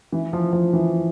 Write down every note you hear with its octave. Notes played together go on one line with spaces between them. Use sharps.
E3
F3
F3
E3